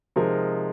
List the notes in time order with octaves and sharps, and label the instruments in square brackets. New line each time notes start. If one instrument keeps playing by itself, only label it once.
[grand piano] C3 F3 G#3 D#4 A#4